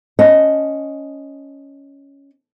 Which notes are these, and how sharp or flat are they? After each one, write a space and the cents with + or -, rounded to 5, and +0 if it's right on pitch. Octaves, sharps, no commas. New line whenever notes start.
C#4 +0 D#5 +0 A5 +0